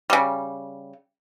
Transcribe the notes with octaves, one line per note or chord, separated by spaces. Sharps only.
C#3 G3